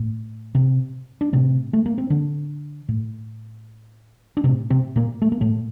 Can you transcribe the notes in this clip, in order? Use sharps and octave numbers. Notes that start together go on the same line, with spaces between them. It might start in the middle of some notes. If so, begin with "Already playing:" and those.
Already playing: A2
C3 C4
D4
A2 C3 C4
A3
A#3
C4
D3 D4
A2
D4
A2 C3 C4
C3 C4
A#2 A#3
A3
A#3
A2 A3